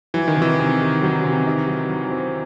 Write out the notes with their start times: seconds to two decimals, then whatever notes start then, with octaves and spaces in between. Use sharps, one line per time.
0.14 E3 F#3
0.28 D#3
0.36 C3
0.42 E3
0.59 C3
0.81 D#3
1.02 F#3
1.24 C3
1.46 D#4
1.67 F#3
1.89 F#3
2.11 C4